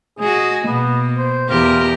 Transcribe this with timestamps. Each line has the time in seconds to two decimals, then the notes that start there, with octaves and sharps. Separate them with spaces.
0.19 G#3 F#4 G#4
0.66 B2 A#3 B3
1.18 C5
1.49 E2 F4 G4 A#4